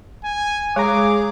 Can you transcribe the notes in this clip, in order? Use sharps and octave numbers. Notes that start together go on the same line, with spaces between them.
G#5
G#3 G#4 C#5 A#5 D6